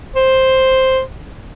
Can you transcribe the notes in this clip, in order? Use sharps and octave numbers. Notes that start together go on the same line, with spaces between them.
C5